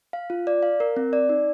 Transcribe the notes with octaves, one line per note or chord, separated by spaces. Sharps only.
F5
F4
D5
F5
A#4
C4
D5
D#4